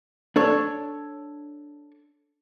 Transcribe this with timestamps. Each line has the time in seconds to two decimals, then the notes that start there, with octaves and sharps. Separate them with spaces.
0.36 D4 A4 C#5